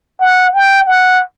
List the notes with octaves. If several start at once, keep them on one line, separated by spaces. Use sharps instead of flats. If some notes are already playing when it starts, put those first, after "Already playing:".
F#5
G5
F#5